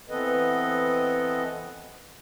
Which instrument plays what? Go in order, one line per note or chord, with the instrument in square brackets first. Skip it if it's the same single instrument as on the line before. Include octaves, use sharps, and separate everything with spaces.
[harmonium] E3 B3 C4 A4 B4 D#5